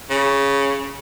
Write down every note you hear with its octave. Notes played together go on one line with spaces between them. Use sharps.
C#3